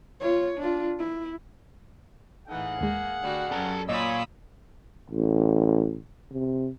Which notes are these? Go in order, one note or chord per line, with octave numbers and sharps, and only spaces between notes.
F4 C#5
D4 F4
E4
A2 E3 D#4 G#4 F5 F#5
D#2 G#3 A#3
D2 G3 F#4
F#2 C#4 A4 A#5
A#2 C#5 D#5 B5 D#6 E6
A1
C3